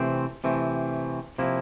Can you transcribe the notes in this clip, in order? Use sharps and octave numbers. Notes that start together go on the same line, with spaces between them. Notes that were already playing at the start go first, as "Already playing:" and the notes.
Already playing: C3 E3 A3 C4
C3 E3 A3 C4
C3 F3 A#3 E4